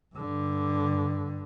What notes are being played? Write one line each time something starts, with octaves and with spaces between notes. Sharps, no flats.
G2 D3